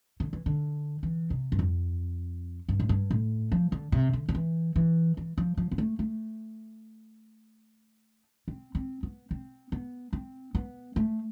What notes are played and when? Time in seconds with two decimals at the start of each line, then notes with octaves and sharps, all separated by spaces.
0.20 D3
0.33 E3
0.46 D3
1.03 E3
1.30 C3
1.52 G2
1.59 F2
2.69 G2
2.80 A2
2.89 G2
3.11 A2
3.52 F3
3.72 D3
3.92 C3
4.13 D3
4.29 D3
4.35 E3
4.76 E3
5.17 E3
5.38 F3
5.57 F3
5.71 B3
5.78 A3
5.99 A3
8.48 C4
8.75 C4
9.03 B3
9.31 C4
9.72 B3
10.13 C4
10.55 B3
10.96 A3